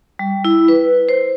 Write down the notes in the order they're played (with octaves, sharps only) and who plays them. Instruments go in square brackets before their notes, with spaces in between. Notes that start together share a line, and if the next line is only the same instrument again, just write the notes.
[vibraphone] G3
E4
B4
C5